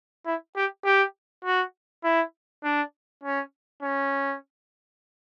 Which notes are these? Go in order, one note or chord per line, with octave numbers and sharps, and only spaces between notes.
E4
G4
G4
F#4
E4
D4
C#4
C#4